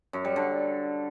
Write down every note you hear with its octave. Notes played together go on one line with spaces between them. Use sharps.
F#2
G3
D3